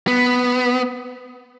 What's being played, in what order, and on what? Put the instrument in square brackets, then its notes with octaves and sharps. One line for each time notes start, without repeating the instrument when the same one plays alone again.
[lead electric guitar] B3